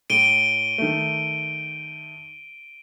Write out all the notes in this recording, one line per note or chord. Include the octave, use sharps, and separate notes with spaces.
A2 D7 D#7 G7
D#3 A3